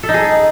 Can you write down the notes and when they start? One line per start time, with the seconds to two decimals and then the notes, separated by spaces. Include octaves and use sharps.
0.03 A4
0.09 D#4
0.14 G#4